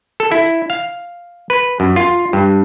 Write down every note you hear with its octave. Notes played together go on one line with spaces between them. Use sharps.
A4
E4
F5
B4
F#2
F4
G2